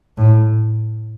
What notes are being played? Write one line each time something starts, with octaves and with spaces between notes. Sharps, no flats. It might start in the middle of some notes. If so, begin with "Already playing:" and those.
A2